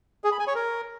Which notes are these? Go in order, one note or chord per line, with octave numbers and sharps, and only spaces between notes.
G#4
B5
G#5
C#5
A#4